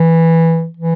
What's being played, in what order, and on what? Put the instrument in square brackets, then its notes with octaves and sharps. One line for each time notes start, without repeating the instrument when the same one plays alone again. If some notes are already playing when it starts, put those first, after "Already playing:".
Already playing: [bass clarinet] E3
E3